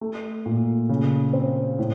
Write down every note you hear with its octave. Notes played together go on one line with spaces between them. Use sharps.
A3
A#2
C#3
C4
A2